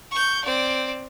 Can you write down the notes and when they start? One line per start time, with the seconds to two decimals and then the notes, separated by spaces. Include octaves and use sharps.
0.11 C#6 G6
0.44 C4 D5